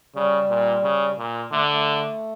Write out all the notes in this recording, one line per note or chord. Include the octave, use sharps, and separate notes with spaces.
C#3 G3
A#2
C#3
A#2
D3 A3
A3